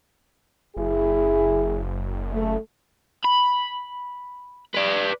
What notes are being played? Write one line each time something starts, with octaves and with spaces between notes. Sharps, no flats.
F#1 E4 G#4
A3
B5
B4 D5